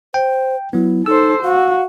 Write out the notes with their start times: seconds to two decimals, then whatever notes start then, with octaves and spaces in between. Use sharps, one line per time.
0.14 C5 G5
0.73 F#3 B3 E4
1.06 D#4 A4 C5 E6
1.43 F#4 F5